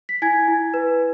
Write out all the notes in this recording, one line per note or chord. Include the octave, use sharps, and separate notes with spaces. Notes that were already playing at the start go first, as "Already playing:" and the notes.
B6
E4 G#5 G#6
E4
B4